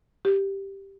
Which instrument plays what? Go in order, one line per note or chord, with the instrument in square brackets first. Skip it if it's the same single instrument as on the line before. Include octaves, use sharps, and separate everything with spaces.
[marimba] G4